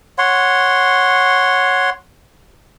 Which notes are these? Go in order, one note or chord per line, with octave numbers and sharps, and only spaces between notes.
C#5 F#5 C6